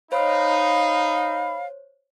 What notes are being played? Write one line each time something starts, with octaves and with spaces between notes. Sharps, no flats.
D#4 C5 C#5 F5 B5